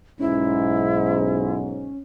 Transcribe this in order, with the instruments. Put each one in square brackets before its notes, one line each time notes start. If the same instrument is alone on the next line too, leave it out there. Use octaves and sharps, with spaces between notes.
[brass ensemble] B1 G#2 [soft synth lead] C#4 [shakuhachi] E4